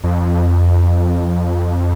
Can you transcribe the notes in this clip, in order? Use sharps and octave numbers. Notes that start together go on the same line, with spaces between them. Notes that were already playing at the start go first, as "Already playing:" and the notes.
F2